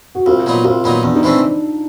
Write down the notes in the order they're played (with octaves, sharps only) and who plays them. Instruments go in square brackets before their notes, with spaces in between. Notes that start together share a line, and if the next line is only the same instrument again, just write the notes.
[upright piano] F#4
[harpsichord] C2 [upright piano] F4
[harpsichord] A#2 F#3 B3 D#4
[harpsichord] C2 [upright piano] F4
[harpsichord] A#2 F#3 B3 D#4
[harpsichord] E2 [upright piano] D4
[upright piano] D#4
[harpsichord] C3 E3 A3 C4 [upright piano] D4